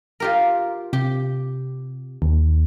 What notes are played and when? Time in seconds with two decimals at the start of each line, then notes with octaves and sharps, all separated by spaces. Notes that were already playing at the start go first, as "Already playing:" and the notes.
0.20 F4 G4 A#4
0.93 C3 G4
2.22 D#2